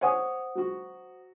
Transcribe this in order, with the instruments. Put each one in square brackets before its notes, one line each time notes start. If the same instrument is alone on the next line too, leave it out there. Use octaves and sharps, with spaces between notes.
[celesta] C5 F#5 D#6 [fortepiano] C#5 G#5
[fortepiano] F#3 F#4